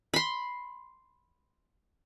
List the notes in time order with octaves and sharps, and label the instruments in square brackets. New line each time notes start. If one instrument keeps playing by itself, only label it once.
[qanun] B5 C6